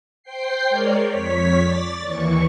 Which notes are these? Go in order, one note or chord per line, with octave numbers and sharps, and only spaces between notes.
C5 G5 C7
G#3 A#4 C#5 D5
F2 C#5 B6
D5 A6
D#2 E3 C#6